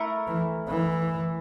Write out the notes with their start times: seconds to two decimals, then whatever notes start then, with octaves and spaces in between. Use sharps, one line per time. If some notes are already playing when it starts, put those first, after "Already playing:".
Already playing: A3 E4 A#4
0.28 E3
0.68 E3